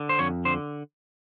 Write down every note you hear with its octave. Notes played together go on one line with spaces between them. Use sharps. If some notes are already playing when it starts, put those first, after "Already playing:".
Already playing: D3
C5
F2 C#5
D3 C5